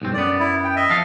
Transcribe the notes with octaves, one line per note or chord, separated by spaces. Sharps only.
B1 G2 C4
F#2 B3 D5
E4
G5
D#5 E5
F2 A4 F5